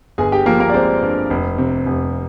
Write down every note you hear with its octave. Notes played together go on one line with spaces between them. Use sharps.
G1 G#4 G#5
G4 G5
F3 A#3 A#4
A#3 A#4
D5
G#3 C4 C5
G2
F1
C3
F1